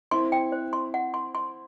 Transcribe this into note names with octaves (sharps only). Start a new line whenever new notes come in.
C4 E4 C6
G5
C5
C6
F#5
C6
C6